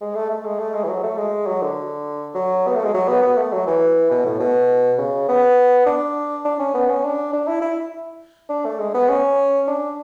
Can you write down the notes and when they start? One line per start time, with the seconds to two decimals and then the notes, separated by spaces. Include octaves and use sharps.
0.01 G#3
0.15 A3
0.30 A3
0.45 G#3
0.59 A3
0.74 G#3
0.84 E3
0.89 F#3
1.03 A3
1.17 G#3
1.47 F#3
1.62 D3
2.35 F#3
2.67 B3
2.76 A3
2.84 G#3
2.94 F#3
3.08 B3
3.22 B3
3.38 A3
3.53 F#3
3.67 E3
4.11 B2
4.25 A2
4.40 B2
4.98 C#3
5.29 B3
5.86 D4
6.45 D4
6.59 C#4
6.74 B3
6.90 C#4
7.04 D4
7.33 D4
7.48 E4
7.62 E4
8.50 D4
8.65 A3
8.79 G#3
8.94 B3
9.09 C#4
9.67 D4